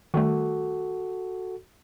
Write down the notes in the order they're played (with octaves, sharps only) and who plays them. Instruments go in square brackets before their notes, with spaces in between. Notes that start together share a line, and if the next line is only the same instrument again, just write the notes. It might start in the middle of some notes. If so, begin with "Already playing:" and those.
[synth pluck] D#3 G3 A3 [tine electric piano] F#4 A4